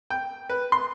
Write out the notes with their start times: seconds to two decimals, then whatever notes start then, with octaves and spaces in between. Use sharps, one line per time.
0.10 G5
0.49 B4
0.72 C6